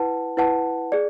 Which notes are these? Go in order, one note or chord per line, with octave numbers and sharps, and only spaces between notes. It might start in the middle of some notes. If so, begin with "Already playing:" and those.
Already playing: E4 B4 F#5 A5
E4 B4 F#5 A5
G#4 D5